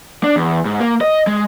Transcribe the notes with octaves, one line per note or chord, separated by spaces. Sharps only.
D4
E2
G#2
A#3
D#5
G#3